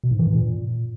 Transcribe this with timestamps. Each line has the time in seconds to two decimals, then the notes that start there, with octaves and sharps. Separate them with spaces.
0.04 B2
0.11 G#2
0.19 E3
0.27 G2
0.35 A#2